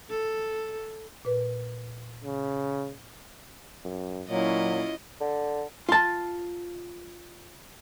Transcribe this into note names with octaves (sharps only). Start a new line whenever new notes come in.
A4
A#2 B4
C#3
F#2
A#2 F#3 C#4 E4 F4 D#5
D3
F4 A5